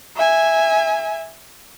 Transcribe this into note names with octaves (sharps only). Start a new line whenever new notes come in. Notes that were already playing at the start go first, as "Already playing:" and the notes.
E5 G#5